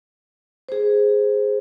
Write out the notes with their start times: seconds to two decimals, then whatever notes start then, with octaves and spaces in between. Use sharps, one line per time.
0.69 G#4 C5